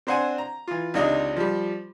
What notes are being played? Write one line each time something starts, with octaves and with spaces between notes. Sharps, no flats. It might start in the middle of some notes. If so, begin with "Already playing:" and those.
C4 D4 C5 F#5 G#5
A#5
E3 F4
C#2 C3 D4 D#4 D#5
F3 G3